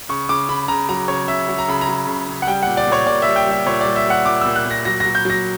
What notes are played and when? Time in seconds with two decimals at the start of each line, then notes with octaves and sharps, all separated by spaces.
0.09 C#3 C#6
0.29 C#3 D6
0.49 C#3 B5
0.68 C#3 A#5
0.89 F#3 A#5
1.08 C#3 C#5
1.28 C#3 E5
1.48 F#3
1.59 A#5
1.68 C#3 B5
1.81 A#5
1.88 F#3
2.07 C#3
2.28 C#3
2.42 F#5
2.47 G3 G5
2.63 A#2 F#5
2.77 D5
2.87 A#2 C#5
3.07 A#2 D5
3.22 G3 E5
3.36 G5
3.47 G3 E5
3.66 A#2 C#5
3.81 G3 D5
3.96 E5
4.06 G3 F#5
4.25 A#2 D6
4.41 A#2 E6
4.55 F#6
4.65 A#2
4.71 A#6
4.85 F#3 A#6
5.00 F#3 A#6
5.15 G6
5.25 F#3 A#6